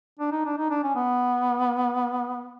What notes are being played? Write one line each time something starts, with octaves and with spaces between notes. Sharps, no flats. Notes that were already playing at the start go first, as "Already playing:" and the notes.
D4
D#4
D4
D#4
D4
C#4
B3